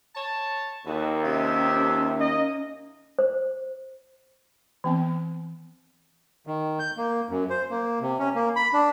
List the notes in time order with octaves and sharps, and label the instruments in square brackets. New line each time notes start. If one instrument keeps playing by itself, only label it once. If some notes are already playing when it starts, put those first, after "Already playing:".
[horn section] C#5 A5
[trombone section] D#2 [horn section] F#4 A4 B4
[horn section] C3 [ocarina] C#4 [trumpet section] F4 E5
[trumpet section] A#3 D#5
[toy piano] C5
[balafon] E3 B3 C4
[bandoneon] D#3
G6
A#3
F#2
C5
A#3
C3
C#4
A#3
B5
D4